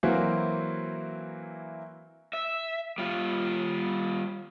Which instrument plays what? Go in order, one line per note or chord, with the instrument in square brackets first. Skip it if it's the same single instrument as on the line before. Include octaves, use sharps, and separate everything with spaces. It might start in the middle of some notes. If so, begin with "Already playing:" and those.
[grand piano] E3 F#3 A#3 C4 E4 F#4
[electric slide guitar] E5
G3 F4